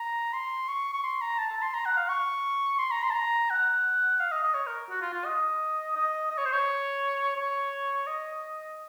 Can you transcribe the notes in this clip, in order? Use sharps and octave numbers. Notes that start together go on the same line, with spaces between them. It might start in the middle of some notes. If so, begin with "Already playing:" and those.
Already playing: A#5
C6
C#6
C#6
C6
A#5
A5
A5
C6
A#5
F#5
F5
C#6
C6
A#5
C6
A5
A#5
F#5
F5
D#5
D#5
C#5
A#4
F#4
F4
F4
D#5
D#5
D#5
C#5
C5
C#5
C#5
D#5